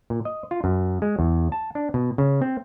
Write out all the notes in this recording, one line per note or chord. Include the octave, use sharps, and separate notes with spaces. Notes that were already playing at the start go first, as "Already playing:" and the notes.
A#2
D#5
F4
F#2
G#3
E2
A5
D4
B2
C#3
C4